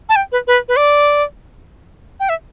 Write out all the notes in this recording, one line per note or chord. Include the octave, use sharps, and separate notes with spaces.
A5
G5
B4
B4
B4
D5
G5
E5